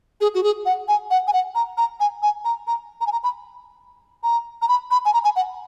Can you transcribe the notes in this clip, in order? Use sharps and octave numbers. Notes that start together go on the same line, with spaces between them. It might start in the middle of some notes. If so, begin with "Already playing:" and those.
G#4
F#4
G#4
F#5
G#5
F#5
G#5
F#5
A#5
A#5
G#5
G#5
A#5
A#5
A#5
G#5
A#5
B5
A#5
A#5
B5
B5
G#5
A#5
G#5
F#5